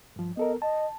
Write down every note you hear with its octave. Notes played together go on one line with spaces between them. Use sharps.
G2 F3
B3 A4 A#4 D#5
D#5 A5